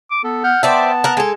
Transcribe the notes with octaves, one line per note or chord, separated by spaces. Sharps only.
D6
B3 A4
F#5 F6 G6
B3 C5 D5 E5 G5 A5
A#4 F#5 A#5
G#3 A4 G#5